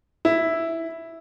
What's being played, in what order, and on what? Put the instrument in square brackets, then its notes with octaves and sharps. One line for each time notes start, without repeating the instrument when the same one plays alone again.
[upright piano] E4